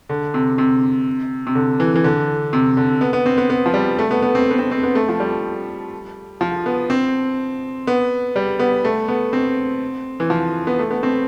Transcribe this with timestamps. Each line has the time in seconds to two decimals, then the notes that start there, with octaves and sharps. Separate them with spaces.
0.09 D3
0.34 C3
0.58 C3
1.47 C3
1.55 D3
1.80 E3
1.96 E3
2.04 D3
2.53 C3
2.77 D3
3.01 B3
3.13 B3
3.26 C4
3.38 B3
3.50 B3
3.66 F3
3.74 G3
3.99 A3
4.11 B3
4.22 B3
4.35 C4
4.51 B3
4.59 C4
4.71 C4
4.83 B3
4.95 A3
5.09 F3
5.20 G3
6.41 F3
6.66 B3
6.90 C4
7.87 B3
8.36 G3
8.59 B3
8.85 A3
9.08 B3
9.33 C4
10.20 E3
10.30 F3
10.67 B3
10.79 A3
10.91 B3
11.03 C4